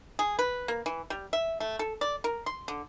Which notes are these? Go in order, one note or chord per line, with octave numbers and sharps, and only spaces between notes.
G#4
B4
A#3
E3
G3
E5
A3
A4
D5
A#4
C6
D3